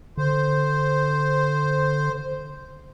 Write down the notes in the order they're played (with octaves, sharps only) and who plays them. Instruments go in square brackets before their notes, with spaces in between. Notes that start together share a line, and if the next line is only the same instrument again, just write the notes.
[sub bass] D3 [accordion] C5